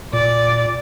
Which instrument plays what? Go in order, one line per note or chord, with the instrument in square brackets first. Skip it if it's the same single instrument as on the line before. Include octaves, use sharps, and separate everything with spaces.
[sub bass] A#2 [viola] D5